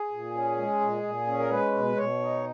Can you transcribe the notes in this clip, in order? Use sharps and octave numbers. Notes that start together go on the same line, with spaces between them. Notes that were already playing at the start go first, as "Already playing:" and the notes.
Already playing: G#4
A#2
C#4
G#3
A#2
A#2
C#4
A#4
G#3 B4
B2
B2 C#5
D#4